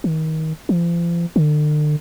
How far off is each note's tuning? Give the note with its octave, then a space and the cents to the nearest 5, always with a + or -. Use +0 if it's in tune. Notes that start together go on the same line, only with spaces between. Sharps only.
D#3 +25
F3 -40
D3 +40